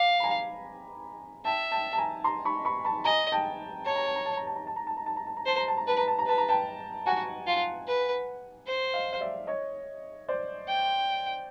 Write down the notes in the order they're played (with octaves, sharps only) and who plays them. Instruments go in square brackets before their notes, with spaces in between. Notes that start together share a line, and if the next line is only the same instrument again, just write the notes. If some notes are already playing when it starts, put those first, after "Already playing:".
Already playing: [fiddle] F5 [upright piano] D6
[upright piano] B5
G#5 A#5
[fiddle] E5 [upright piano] G5 A5
[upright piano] G5 A5
A5
G#5 A#5
A#5 C6
B5 C#6
B5 C#6
A5 B5
[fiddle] D#5 [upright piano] G#5 A#5
[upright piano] G5 A5
[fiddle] C#5 [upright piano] A5
[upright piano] A#5
A5
A#5
A5
A#5
A5
A#5
A5
A#5
A5
A#5
A5
A#5
A5
A#5
[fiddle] C5 [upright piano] A5
[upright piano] A#5
A5
A#5
[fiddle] B4 [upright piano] A5
[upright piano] A#5
A5
A#5
[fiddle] B4 [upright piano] A5
[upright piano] A#5
G5 A5
[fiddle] F#4 [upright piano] F#5 G#5
[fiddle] F4
B4
C5
[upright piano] D#5 F5
F5
D5 E5
C#5 D#5
C5 D5
[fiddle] G5